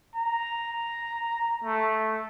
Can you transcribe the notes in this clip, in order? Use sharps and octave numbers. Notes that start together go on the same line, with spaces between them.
A#5
A3